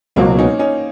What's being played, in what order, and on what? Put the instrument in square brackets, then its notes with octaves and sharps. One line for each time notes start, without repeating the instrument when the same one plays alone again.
[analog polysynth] C#2 B2 F#3 [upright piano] A#3 C4
[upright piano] C#4 D#4
C#4 D#4